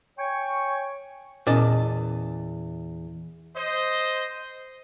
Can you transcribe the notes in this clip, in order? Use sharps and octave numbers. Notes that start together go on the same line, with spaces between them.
C#5 G5 G#5 C#6
E2 A#2 C#4 D#5 A5
C5 D#5